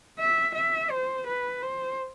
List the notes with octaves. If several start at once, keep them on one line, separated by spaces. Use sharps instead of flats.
E5
E5
C5
B4
C5